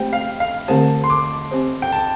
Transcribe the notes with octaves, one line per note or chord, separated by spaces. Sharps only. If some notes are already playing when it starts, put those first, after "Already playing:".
Already playing: A3 C4 G4 C5 G5
F5
F5
D3 A3 C4 G4 C5 A5
C6
D6
C4 G4 C5
G5
A5